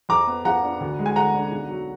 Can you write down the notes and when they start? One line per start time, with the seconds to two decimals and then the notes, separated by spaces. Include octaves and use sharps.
0.09 F2 A#5 D6
0.27 B3
0.45 F3 F#5 A#5
0.63 D4
0.80 D2
0.99 G#3
1.06 G#5
1.16 D3 F#5 A#5
1.33 D4
1.52 B1
1.69 F#3